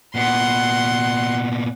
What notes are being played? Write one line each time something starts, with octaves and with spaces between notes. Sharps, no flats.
A#2 B3 F#5 C6